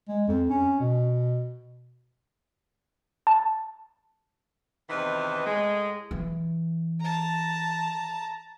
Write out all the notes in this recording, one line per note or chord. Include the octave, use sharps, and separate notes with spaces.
G#3
F2
C#4
B2
A5
E2 C3 D#3 E3 B4 D#5
A2 G#3
E3
A5 A#5